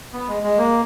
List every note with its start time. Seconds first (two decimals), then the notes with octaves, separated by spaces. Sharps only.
0.13 B3
0.28 G#3
0.43 G#3
0.58 A#3